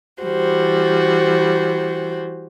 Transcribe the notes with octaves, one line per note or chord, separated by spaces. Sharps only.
E3 G3 F#4 C5